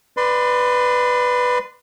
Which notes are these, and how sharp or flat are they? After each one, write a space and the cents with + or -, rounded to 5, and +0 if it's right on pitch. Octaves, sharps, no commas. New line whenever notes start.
B4 +0 D5 +25 C6 -25